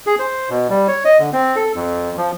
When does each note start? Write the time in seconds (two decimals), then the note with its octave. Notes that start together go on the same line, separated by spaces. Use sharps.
0.07 G#4
0.19 C5
0.50 B2
0.69 G3
0.88 C#5
1.05 D#5
1.19 D3
1.33 C4
1.56 A4
1.76 F2
2.18 F3